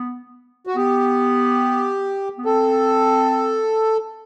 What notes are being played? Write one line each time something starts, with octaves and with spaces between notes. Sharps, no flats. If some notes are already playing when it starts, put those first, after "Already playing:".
Already playing: B3
F#4
B3 G4
B3
C4 A4